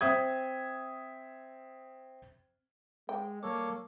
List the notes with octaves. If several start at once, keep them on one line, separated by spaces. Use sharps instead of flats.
C4 E5 D#6 G#6
G#3 G5
G3 A#3 A4 C#5 D6